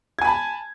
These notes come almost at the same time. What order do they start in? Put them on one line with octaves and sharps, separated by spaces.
G#6 G#5 B5 A5